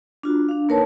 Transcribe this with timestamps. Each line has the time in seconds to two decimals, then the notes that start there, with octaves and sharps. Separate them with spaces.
0.23 D4 F4 F#4
0.49 D4 F5
0.69 A#3 D#4 A#4 B4 C#5 A5